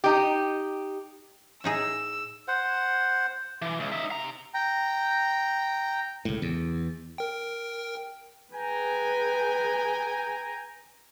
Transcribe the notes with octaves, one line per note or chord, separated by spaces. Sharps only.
D#4 G4
A2 D#4 G#4 E6
C5 F#5
E3
C#2
D#4 E5
C3 A#5
G5 A#5
C#2 A2
E2
A#4 G5
G#4 B4 G5 G#5 A#5